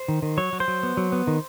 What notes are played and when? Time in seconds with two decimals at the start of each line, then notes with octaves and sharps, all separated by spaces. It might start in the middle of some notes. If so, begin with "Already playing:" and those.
Already playing: C5
0.08 D#3
0.22 D#3
0.38 F#3 C#5
0.53 F#3
0.60 C5
0.68 F#3
0.83 B3
0.97 F#3
1.12 B3
1.27 D#3